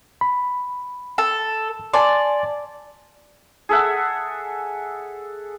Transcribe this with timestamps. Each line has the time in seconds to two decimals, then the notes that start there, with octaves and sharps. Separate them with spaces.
0.21 B5
1.18 A4
1.94 D5 G#5 A5 C6
3.69 G#4 A4 E5 F#5